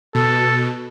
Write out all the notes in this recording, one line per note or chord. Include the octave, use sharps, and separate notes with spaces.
B2 A4